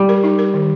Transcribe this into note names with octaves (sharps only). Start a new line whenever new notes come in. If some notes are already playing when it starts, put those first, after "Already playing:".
Already playing: G3
A#4
D#4
A#4
D#3